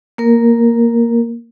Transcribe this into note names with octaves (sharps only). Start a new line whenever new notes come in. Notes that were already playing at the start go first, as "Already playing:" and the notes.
A#3 A#4